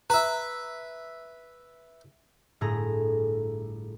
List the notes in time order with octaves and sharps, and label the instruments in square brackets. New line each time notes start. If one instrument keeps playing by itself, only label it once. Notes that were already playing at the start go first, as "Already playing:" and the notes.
[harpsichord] B4 E5 [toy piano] A#5
[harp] G1 A2 A3 G#4 A#5